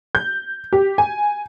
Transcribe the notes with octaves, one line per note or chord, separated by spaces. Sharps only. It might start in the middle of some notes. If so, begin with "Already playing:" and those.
G6
G4
G#5